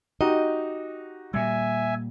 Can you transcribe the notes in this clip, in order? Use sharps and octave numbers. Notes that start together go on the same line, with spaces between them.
D#4 F#4 G4 D#5
A#2 G3 E5 G#5